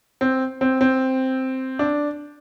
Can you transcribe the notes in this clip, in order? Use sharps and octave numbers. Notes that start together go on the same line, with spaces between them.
C4
C4
C4
D4